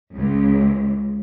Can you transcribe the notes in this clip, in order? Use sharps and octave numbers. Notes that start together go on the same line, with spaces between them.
C#2